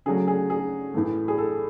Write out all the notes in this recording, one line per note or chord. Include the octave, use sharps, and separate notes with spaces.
C#3 F#3 A3 G#4
G#4
G#4
A2 E3 A3
G#4
A4